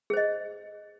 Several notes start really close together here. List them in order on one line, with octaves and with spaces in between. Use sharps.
G#4 C5 D#5